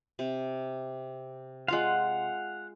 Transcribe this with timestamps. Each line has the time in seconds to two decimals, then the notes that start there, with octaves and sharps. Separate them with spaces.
0.19 C3
1.68 G#3 F4 F5 F#5 C6